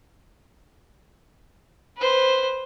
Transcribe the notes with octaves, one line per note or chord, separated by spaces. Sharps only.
B4 C5